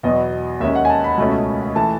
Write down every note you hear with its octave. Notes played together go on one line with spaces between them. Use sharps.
E2 B2 F#3 B3 D#5
D#2 D#3 G#3 C#4 E5
F#5
G#5
A5
B5
C#2 B2 A3 C#4
E3 A3 A5